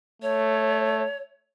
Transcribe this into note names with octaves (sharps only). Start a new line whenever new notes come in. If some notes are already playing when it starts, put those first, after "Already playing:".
A3 C#5